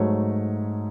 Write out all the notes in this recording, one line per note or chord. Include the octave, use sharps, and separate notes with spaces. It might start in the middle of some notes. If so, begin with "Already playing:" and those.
Already playing: G#2 F#3 A3 C#5